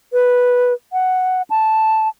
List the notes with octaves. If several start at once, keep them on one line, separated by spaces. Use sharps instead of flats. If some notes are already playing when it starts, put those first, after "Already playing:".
B4
F#5
A5